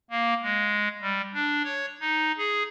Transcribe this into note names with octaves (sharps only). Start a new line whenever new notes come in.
A#3
G#3
G3
D4
C#5
D#4
G#4